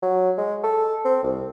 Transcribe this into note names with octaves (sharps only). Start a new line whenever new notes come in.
F#3
G#3
A4
C4
C2